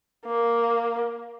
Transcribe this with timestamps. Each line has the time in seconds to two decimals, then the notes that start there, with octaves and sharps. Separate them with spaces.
0.26 A#3